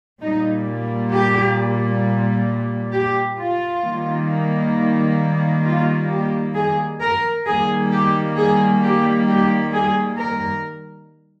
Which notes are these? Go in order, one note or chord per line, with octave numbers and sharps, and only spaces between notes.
A#2 G3 A#3 D#4
G4
G4
F4
D#3 G3 A#3
F4
G4
G#4
A#4
D#3 G3 A#3 G#4
G4
G#4
G4
G4
G#4
A#4